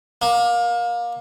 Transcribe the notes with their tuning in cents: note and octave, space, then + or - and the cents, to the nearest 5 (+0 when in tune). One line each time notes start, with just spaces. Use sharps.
A#3 +25